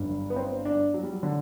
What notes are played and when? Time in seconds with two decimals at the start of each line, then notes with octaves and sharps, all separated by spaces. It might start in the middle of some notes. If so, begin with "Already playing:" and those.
Already playing: G1 G2 F#3
0.30 B3
0.36 C4
0.65 D4
0.94 F#3
1.03 G3
1.11 F#3
1.23 D3